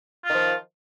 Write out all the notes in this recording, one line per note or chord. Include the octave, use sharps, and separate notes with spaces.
D#3 F3 F4